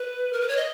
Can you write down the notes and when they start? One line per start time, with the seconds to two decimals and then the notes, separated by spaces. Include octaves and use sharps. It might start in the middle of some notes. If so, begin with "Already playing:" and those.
Already playing: B4
0.33 A#4
0.41 B4
0.48 C#5
0.57 D#5